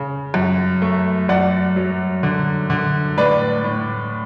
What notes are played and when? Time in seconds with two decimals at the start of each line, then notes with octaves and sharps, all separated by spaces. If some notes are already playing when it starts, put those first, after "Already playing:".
Already playing: C#3
0.34 F#2
0.82 A3
1.29 F#2 D5 F#5
1.76 F#3
2.23 D3
2.70 D3
3.18 A2 B4 D5
3.64 A2